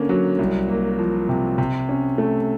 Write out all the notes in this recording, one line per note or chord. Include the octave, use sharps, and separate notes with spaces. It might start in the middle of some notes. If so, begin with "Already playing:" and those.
Already playing: D3 A#3 C#4
F#3
C2
A#3
F3
C3
C3
C#4
A3